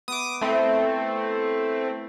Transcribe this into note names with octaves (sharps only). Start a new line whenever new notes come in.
B3 D6 D#6
A3 C4 E4